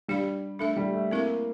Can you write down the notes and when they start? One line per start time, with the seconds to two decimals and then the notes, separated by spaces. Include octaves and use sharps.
0.08 G3 D4 G4 D5 F5
0.59 A3 D4 A4 E5
0.77 G3
0.94 A3
1.11 A#3 C4 E4 A4 E5